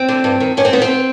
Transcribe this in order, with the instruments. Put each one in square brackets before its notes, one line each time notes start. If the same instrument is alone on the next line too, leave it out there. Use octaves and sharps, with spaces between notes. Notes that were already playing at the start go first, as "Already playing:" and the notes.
Already playing: [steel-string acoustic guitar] C4
D3
G2
D#3
G2 C#4
C4
D#3 B3
C4